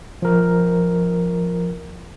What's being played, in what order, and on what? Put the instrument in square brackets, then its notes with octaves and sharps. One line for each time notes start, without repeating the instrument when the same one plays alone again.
[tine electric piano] F3 A#4